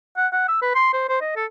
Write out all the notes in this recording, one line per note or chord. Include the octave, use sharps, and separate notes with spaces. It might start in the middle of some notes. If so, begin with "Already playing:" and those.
F#5
F#5
E6
B4
C6
C5
C5
D#5
A4